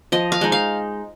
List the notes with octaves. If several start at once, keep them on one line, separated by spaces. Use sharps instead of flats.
F3 D#5
F5
G#3 D#4
F5